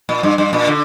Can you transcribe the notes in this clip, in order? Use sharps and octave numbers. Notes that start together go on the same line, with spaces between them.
A#2
G2
G2
A#2
D3